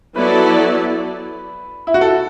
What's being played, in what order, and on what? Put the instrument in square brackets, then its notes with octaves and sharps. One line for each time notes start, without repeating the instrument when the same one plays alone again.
[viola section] F#3 B3 E4 A4 D5 [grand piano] B4
[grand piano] E4
F#4
A4